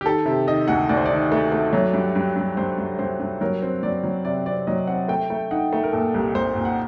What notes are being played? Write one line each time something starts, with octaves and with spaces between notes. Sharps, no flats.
G4
D#3 A4
C3 G4
D#3 D#5
D2 F#5
D2 D5
C5
D5
D#3
A3
A3
F#3
G2
G2
G2
G2 C5
G2
G2 C5
G2
F#3 A#4
C4
F#3 D5
F#3
C3 D5
C4 D5
F#3 D#5
C4 F#5
A3 G5
A3
D#4 F#5
A3
A#4
A#2 A4
C2
C2 C5
A#2
F#5